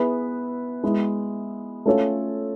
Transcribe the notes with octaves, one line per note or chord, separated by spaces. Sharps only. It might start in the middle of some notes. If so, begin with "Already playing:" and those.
Already playing: B3 E4 G#4 B4
G#3 B3 E4
A3 C#4 F4 A4 C#5